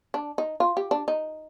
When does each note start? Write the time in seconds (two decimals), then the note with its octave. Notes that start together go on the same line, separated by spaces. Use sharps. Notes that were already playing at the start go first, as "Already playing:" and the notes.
0.14 D4
0.38 D#4
0.60 F4
0.77 G4
0.91 D4
1.08 D#4